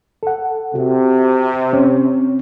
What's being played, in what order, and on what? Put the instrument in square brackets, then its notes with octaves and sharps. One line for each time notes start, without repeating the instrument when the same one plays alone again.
[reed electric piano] A4 F#5
[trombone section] C3 [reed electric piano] F#4
[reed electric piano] C4 C#4 C#5